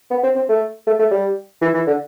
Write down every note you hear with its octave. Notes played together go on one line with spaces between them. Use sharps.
B3
C4
C4
A3
A3
A3
G3
E3
E3
D3